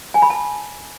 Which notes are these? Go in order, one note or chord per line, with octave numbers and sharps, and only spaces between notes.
G#5
B5
A5